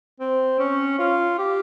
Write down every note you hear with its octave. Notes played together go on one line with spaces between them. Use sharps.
C4
C#4
F4
G4